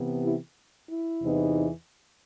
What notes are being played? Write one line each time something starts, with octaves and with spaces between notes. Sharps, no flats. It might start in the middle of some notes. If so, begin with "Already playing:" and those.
Already playing: C3 E3 B3
E4 G4
E4
E2 C3 E3 B3 D#4